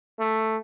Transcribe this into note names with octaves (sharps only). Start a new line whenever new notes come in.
A3